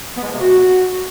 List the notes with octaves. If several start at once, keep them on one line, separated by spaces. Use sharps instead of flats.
B3
G#3
F3
C3
F#4